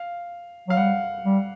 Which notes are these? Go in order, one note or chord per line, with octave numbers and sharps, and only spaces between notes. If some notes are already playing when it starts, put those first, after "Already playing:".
Already playing: F5
F#3 F5
G3 F#5
G3